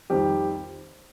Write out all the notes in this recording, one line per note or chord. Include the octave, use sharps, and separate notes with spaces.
F2 D#3 G3 G4